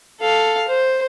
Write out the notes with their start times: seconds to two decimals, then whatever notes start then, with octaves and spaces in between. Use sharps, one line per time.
0.20 A4 F5
0.68 C5